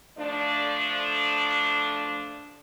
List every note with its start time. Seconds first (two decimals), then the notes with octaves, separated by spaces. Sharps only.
0.18 F3 A3 D4